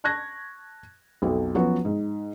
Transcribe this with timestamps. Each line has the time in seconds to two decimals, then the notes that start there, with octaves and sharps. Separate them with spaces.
0.04 A5 C#6 F#6 G#6 A#6
1.22 B1 F2 A4
1.55 F3 F#3 B3 C#4 F#4 B4
1.85 G#2